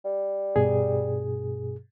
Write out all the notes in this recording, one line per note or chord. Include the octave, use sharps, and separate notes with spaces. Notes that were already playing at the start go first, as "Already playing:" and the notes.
G3
G2 B2 G#4